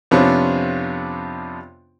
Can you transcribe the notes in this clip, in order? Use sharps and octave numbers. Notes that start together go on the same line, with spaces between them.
F2 C3 B3 C#4 D4 F4